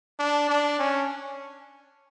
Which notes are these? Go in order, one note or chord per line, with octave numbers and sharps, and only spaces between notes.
D4
D4
C#4